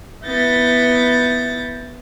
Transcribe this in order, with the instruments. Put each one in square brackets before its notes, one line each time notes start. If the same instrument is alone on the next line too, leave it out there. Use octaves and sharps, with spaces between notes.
[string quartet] B3 E4 G6 A6 A#6